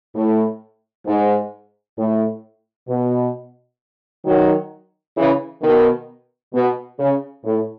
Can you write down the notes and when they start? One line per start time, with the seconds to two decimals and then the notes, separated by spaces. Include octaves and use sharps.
0.15 A2
1.07 G#2
1.98 A2
2.89 B2
4.26 D#3 F#3
5.17 C#3 E3
5.62 B2 D#3
6.54 B2
6.99 C#3
7.45 A2